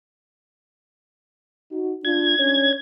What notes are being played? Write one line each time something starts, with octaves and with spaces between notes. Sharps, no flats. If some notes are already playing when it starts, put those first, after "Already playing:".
D#4 F#4
D4 F4 G#6
C#4 D4 C#5